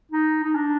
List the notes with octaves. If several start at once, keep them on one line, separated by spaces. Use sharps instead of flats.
D#4
D#4
D4